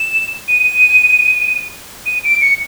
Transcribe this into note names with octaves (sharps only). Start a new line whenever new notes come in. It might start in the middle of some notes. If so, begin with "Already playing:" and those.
Already playing: E7
D#7
D#7
D7
C#7